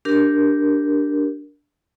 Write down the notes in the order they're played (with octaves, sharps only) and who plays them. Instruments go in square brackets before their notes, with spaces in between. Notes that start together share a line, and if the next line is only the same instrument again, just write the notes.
[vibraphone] D4 G4 A#4